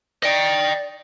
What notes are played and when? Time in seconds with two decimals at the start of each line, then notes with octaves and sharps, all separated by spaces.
0.23 D5 D#5 G5